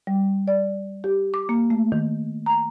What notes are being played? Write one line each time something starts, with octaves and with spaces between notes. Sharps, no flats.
G3
D5
G4
D6
A#3
A3
D#3
A#5